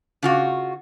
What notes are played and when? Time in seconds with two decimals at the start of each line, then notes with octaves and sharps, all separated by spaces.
0.23 C#3 F4 F#4